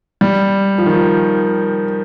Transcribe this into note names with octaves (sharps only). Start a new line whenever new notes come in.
G3
F3
D#3
F3